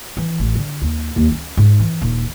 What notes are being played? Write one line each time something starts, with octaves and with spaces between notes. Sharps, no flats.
E3
A1
D3
D#2
D#2
C#4
G#2
E3
D#1